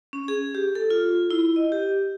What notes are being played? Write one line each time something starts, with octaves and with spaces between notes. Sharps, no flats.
C#4
G#4
G4
A4
F4
E4
D#5
G4